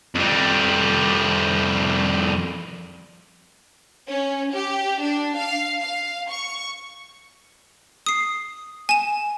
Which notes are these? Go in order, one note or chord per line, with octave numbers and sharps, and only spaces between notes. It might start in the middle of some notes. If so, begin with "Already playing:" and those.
F2 G3
C#4
G4
D4
F5
F5
C#6
D#6 C7
G#5 E7